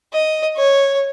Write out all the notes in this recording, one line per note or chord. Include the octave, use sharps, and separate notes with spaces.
D#5
C#5